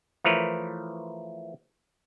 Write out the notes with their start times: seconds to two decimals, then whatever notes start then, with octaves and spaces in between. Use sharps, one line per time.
0.24 E3 F3 A3 A#4 B4 C#5